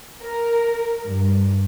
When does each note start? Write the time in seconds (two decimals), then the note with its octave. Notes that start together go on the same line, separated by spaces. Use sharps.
0.22 A#4
1.07 G2